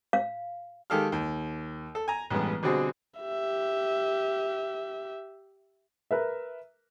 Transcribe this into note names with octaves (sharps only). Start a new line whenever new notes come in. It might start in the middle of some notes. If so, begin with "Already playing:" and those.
F5
D#3 G#3 G4 A4 F5 F6
D#2
A4
G#5 A#5
A1 G2 G#3 B3
B2 D3 G3 C4 F#4 G#4
G4 E5
A#4 B4 E5